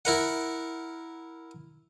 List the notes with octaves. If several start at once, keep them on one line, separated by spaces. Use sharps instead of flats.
E4 A#4 F#5